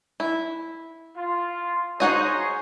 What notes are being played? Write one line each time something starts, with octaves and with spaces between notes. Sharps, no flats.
E4
F4
D#4 F#4 G#4 C5 C#5 D#5